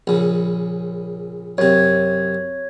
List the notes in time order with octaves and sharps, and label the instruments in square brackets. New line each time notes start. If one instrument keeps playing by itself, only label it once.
[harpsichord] A#1 C#3
[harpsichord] F#2 C3 [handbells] C#5 G#6